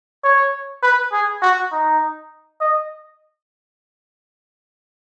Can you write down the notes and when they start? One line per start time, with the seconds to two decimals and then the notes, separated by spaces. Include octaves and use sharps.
0.24 C#5
0.83 B4
1.12 G#4
1.42 F#4
1.72 D#4
2.60 D#5